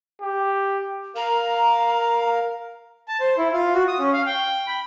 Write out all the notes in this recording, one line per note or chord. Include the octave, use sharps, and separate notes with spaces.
G4
A#4 F5 A#5
A5
C5
E4
F4
F#4
D#6
C#4
F5
G5
B5